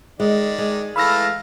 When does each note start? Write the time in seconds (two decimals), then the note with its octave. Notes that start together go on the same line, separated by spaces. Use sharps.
0.20 D#3 G#3 D5
0.58 G#3
0.96 E3 A3 F5 B5 E6 A#6